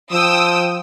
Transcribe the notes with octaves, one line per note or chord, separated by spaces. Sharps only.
F3 G5 D#6 E6